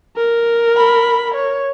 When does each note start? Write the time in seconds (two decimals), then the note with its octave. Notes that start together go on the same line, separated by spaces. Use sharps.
0.17 A#4
0.77 B5
1.35 C#5